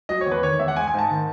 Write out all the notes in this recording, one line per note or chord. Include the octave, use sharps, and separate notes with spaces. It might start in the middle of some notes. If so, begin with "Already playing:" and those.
F#3 D#5
C#5
E2
B4
D#3 C#5
E2 E5
F#5
G#3 G#5
G#5
G#2 A5
D#3